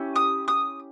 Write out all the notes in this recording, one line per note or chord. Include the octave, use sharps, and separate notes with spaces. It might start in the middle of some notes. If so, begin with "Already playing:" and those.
Already playing: C#4 E4 G4
D#6
D#6